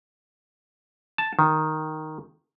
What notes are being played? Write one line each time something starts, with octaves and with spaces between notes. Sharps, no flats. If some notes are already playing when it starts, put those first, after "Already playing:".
A5
D#3